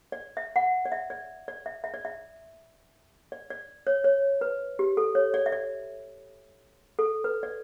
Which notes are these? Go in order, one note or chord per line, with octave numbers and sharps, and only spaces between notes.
D5
E5
F#5
D5
E5
D5
D5
E5
E5
D5
E5
D5
D5
C#5
C#5
B4
G4
A4
C#5
D5
E5
D5
A4
B4
D5